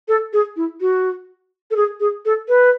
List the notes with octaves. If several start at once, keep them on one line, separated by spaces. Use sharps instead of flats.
A4
G#4
E4
F#4
A4
G#4
G#4
A4
B4